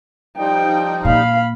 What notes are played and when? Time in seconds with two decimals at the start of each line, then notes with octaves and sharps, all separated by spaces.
0.38 F3 G3 D#4 G5
1.05 A#2 F5 B5